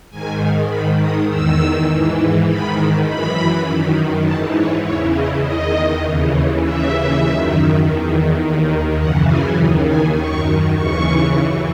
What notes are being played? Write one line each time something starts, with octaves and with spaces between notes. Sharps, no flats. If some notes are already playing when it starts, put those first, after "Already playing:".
G#2 D#3 G#5
G#2 D#3 B5
D#6
E2 D#3 E6
G#2 E3
G#2 D#3 B5
F#2 E3 B5
F#2 D#3
G#2 E3 A5
C#5
E2 C#3 E3 C#5
D#5
E2 D#3 D#5
D#2 C#3 E3
D#2 C#3 E3 E5
F#2 D#3
E2 D#3
D#2 D#3
F#2 C#3 E3 F#5
G#5
D#2 D#3
G#5
F#2 D#3 C#6
D#2 C#3 E3 C#6
F#2 E3